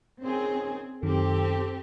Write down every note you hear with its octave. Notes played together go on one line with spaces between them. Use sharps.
A#2 D#3 C4 C#4 G#4
F#2 D#3 C4 G4 A4